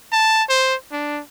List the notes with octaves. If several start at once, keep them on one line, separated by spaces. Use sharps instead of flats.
A5
C5
D4